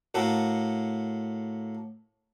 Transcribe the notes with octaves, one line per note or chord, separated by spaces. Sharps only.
A2 A#3 F#4 A4